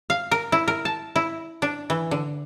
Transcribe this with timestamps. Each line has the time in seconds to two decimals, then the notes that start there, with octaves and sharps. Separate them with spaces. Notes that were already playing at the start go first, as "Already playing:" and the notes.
0.10 F5
0.31 A#4
0.52 E4
0.68 A#4
0.85 A5
1.16 E4
1.62 D4
1.90 E3
2.11 D3